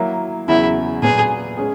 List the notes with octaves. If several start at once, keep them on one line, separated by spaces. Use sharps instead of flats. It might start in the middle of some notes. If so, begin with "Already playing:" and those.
Already playing: F#3 A#3 E4
E2 C#3 F#3 E4
A#2 F#3 B3 G#4
G#3 C#4 G#4